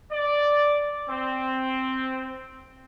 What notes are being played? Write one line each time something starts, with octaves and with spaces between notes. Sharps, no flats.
D5
C4